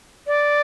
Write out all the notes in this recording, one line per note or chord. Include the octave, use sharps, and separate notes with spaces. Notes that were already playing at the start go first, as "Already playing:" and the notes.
D5